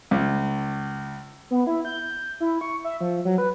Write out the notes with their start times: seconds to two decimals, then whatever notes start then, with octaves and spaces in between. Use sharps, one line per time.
0.11 C#2
1.51 B3
1.67 E4
1.85 G6
2.40 E4
2.61 C#6
2.84 E5
3.01 F3
3.25 F#3
3.38 B4